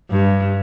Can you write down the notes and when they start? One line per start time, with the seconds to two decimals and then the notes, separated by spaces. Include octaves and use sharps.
0.10 G2